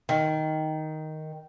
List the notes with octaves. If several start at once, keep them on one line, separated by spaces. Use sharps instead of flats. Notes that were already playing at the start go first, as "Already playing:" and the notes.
D#3